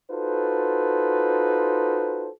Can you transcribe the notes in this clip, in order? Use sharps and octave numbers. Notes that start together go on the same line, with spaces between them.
D#4 F4 F#4 A4 B4 C5